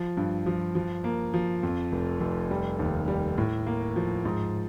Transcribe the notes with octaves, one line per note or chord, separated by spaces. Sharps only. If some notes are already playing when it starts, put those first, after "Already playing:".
Already playing: F3
G2
F3
F3
A#3
F3
F2
F1
F1
G3
D#2
G3
A2
A#3
F3
G#2